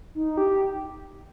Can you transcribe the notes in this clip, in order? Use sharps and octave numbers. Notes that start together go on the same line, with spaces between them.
D#4
G4